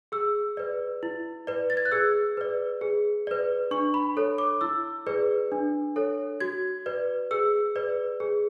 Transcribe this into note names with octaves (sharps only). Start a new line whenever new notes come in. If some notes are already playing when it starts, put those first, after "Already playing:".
G#4 E6
B4 D5
E4
B4 D5
A6
G#6
F#6
G#4 E6
B4 D5
G#4
B4 D5
D4 C#6
B5
A4 C#5
D6
E4 E6
G#4 B4 D5
D4
A4 C#5
F#4 G#6
B4 D5
G#4 E6
B4 D5
G#4